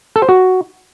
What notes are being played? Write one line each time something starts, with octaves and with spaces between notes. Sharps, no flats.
A4
C5
F#4